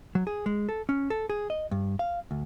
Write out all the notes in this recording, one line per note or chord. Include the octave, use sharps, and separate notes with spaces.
F#3
G#4
G#3
A4
C#4
A4
G#4
D#5
G2
F5
D2